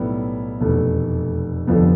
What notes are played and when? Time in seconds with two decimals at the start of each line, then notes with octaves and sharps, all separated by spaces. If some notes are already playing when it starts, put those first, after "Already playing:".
Already playing: B1 A2 G3 B3 E4
0.60 F1 E2 B2 A3
1.67 F1 F2 D3 F3 B3